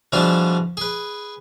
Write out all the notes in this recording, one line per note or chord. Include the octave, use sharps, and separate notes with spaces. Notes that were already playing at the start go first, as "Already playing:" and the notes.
B2 E3 F3 G3 D4 G#4
G#4 B4